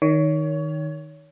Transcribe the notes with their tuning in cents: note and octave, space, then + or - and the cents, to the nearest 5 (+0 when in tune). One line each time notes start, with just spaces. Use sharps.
D#3 +0 C#5 +25